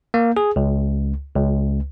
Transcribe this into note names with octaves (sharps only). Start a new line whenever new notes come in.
A#3
G#4
C#2
C#2